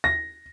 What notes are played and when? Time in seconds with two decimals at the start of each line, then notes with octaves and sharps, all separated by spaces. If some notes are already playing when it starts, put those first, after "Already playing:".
0.04 A#6